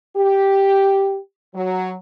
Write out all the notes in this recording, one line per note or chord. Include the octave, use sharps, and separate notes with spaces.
G4
F#3